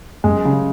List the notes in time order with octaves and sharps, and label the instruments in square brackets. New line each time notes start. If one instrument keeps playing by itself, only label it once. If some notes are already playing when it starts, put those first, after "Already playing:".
[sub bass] F#2 [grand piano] G#3
[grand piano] C#3